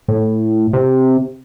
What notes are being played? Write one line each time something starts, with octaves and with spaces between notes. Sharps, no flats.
A2
C3